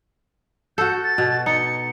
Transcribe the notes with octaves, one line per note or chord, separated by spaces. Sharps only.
F#4 A4 G6
A6
B2
D#4 C#7